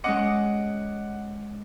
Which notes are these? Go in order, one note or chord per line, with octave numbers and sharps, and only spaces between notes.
G#3 C#4 D#5 F#5 D6 C#7